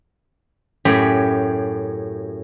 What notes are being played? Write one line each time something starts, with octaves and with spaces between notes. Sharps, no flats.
F#2 A2 G4 C#5 B5